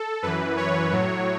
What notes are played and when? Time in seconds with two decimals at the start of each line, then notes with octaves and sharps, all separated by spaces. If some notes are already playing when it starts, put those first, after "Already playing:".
Already playing: A4
0.23 F#2 E3 B4
0.57 C#5
0.92 A2 F#3